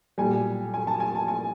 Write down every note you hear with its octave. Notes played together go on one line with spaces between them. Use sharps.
B1 A#2 G3 G#5
G#5
A5
G#5
A5
G#5